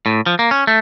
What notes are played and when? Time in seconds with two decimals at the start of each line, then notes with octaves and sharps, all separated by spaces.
0.06 A2
0.26 F3
0.39 A#3
0.51 C#4
0.67 A3